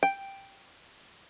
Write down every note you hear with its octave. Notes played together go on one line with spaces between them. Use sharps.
G5